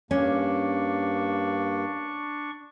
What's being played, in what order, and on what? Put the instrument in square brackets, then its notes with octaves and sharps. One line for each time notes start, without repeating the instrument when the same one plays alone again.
[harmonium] G2 A#3 [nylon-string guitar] C#4 [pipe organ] D4 C#6